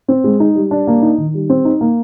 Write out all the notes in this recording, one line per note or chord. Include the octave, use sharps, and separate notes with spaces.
C4
G#3
D#4
G3
D4
A#3
D#4
D#3
G3
C4
D#4
A#3